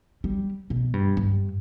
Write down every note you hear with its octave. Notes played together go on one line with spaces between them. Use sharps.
G3
B2
G2
G2